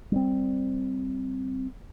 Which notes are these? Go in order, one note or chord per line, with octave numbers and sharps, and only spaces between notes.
G3 B3 C4